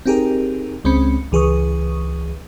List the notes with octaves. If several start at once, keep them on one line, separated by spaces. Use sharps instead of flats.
C4 D#4 G4 G#4 A#4
C#2 G#3 C4 C#4 B5 C#7
C#2 E3 G#4 B4 C#6 D#6